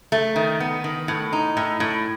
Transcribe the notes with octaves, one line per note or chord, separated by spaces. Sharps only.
A3
D#3
B3
D#3
A2
D#4
A2
A2